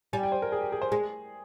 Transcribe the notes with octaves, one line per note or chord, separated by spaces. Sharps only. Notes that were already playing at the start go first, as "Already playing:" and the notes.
G3 G#5
G5
C5
A#4
G#4
G4
G#4
C5
G#3 G#4